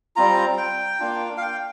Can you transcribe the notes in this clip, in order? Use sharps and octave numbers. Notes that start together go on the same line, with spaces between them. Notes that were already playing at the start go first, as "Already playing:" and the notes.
G3 C4 F4 A#5
G5
A#3 D4 F4
F5
G5